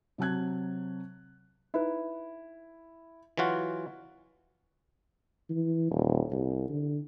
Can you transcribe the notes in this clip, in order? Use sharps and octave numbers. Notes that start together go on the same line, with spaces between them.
C3 F#3 A5 F#6 G#6
D#4 E4 B4
E3 F#3 F4 F#4
E3
D#1
C2
D3